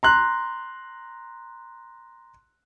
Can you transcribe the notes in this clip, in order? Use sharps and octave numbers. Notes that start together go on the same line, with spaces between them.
A#5 C6 F#6